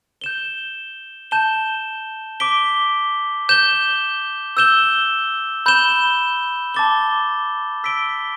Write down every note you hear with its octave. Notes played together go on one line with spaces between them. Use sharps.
G6 E7 G7
A5 G6 E7 G7
D6 B6 D7 G7
G6 E7 G7
E6 G6 E7 G7
B5 G6 E7 G7
A5 D6 A6 G7
E6 B6 D7 G7